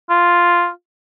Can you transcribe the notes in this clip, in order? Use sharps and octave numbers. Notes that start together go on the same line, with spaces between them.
F4